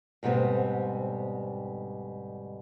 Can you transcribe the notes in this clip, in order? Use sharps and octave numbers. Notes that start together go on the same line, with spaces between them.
D2 G#2 B2 G3 B3 C4